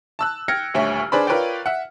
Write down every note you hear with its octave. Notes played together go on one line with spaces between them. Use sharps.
A5 E6 F#6
G5 F6 G#6 A#6 C#7
D#1 D2 C#5 E5 C#6
D4 G#4 B4 C5 D5 B5
F4 A#4 B4 C#5 D5 G5
E5 F#5